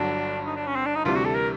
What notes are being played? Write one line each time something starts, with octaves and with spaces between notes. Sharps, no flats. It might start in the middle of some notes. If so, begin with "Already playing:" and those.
Already playing: G1 G2 D3 F#3 D4
D#4
D4
C#4
C4
D4
D#4
D2 C3 E3 G3 F4
F#4
A4
A#4